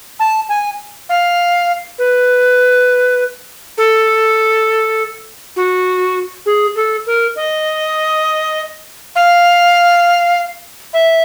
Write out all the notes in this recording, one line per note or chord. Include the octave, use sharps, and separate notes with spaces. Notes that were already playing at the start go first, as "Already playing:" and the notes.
A5
G#5
F5
B4
A4
F#4
G#4
A4
A#4
D#5
F5
E5